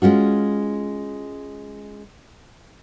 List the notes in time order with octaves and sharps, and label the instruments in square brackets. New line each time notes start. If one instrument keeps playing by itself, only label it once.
[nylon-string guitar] G#3 C#4 F4 F#4